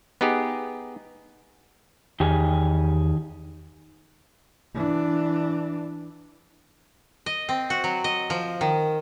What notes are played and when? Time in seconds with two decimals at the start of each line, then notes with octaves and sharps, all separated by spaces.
0.21 B3 D#4 G4 G#4
2.20 E2 D#3 G4 G#4
4.74 E3 D4
7.26 D#5
7.49 C4
7.70 F#4
7.84 F#3
8.04 D#5
8.30 F3
8.61 D#3